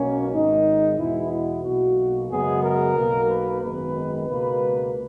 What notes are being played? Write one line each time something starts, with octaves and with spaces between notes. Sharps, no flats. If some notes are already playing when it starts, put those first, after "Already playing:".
Already playing: B1 B2 A#3 C#4
G#1 G#2 D#3 D#4
E2 B2 G#3 B3 E4
E4
B1 B2 A#3 F#4
F#2 C#3 G#3 B3 G#4
A#4
B1 B2 A#3
B4
G#1 F#2 D#3 G#3 B3 B4
C#2 B2 A#3 B4